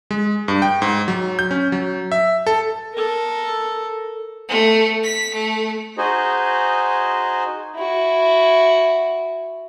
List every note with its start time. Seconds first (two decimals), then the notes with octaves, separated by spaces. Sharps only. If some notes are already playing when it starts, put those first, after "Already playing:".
0.11 G#3
0.48 G2
0.62 G5
0.82 G#2
1.08 F#3
1.39 G6
1.51 C#4
1.72 F#3
2.12 E5
2.47 A4
2.93 A4 A#4
4.49 A3
5.04 B6
5.34 A3
5.98 D#4 F#4 G#4 C5 D#5
7.76 E4 F#4